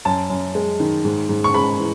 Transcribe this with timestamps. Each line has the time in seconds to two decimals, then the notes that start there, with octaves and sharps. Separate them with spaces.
0.05 F#2 A5
0.30 F#2
0.55 G#3
0.80 D#3
1.05 G#2
1.29 G#2
1.44 C#6
1.54 G#3 B5
1.79 E3